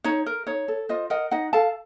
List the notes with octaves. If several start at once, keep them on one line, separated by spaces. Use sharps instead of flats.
D#4 C#5
A#4
D#4 C#5
A4
F4 C5 D#5
A#4 D#5 F#5
D#4 D#5 F#5
A4 F5 A5